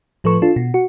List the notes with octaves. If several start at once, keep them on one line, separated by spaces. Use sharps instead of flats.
A2 F3 A4 B4 C#6
D4 F4 A4
B2
F#4